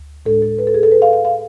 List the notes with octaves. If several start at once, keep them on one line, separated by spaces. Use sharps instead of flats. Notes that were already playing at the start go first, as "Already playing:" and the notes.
Already playing: D2
A2 G#3 D4 A4
A4
B4
A4
G#4
A4
B4
F5
F5
F5